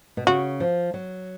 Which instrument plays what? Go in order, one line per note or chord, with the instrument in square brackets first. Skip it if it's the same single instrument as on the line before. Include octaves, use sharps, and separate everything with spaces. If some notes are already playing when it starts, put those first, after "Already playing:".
[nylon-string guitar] B2
[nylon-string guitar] C#3 [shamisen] F#4
[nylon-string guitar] F3
F#3